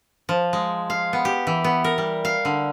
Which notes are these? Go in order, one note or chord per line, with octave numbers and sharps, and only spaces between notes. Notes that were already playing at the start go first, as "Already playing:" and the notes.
F3
G#3
F5
B3
G4
E3
B3
A#4
G3
F5
D3